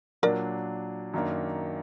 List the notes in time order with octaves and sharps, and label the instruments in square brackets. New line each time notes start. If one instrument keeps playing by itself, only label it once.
[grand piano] A#2 F#3 D4 [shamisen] A#4 D5
[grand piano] F#2 D#3 A#3 D4